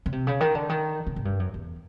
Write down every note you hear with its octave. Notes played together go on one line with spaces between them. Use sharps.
C#3
C3
C#3
D#3
D3
D#3
C#3
G#2
G2
F#2
E2